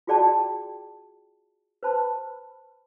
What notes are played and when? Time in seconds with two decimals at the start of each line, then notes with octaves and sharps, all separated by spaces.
0.07 F4 F#4 G#4 D5 G5 A5
1.83 B4 C5 A5 B5